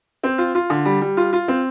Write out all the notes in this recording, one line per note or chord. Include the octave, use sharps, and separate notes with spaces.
C4
F4
F4
D3
G3
G3
F4
F4
C4